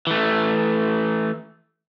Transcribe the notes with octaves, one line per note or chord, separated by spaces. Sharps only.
E3 A3